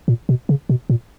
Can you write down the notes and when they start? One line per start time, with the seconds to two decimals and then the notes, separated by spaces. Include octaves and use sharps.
0.08 A#2
0.29 B2
0.49 C#3
0.69 B2
0.90 A#2